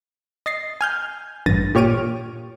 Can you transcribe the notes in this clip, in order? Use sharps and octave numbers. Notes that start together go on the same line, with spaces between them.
D#5 A6 C7
G#5 F6 G6
A1 G2 A6 A#6 D#7
A#2 G4 C#5 F6 D7 D#7